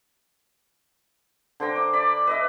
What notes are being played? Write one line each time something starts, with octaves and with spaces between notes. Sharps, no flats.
D3 C5 G5 A#5
D6
D5 B5
B4 D#5 E5